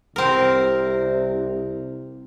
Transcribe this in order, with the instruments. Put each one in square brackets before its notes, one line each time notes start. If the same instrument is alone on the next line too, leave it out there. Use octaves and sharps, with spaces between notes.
[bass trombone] C2 [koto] C4 A#4